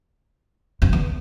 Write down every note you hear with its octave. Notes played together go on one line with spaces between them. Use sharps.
F2
E2